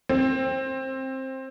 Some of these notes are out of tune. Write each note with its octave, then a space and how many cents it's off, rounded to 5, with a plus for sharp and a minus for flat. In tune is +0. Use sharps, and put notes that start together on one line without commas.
C4 +15